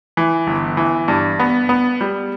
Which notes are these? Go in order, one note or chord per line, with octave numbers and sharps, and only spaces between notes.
E3
G1
E3
G2
B3
B3
G3